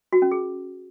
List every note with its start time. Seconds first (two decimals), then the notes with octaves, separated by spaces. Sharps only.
0.13 F#4
0.22 C#4
0.31 G#4